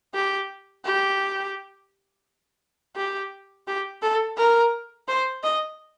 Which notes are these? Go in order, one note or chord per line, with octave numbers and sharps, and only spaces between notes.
G4
G4
G4
G4
A4
A#4
C5
D#5